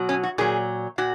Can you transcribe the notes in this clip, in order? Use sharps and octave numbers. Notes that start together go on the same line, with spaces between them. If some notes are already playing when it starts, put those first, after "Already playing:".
Already playing: B2 F#3
C#4
F#4
A#2 F#3 G#4
A#2 F#4